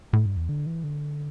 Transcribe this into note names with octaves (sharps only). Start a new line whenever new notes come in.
A2
G2
E2
D3
E3
D3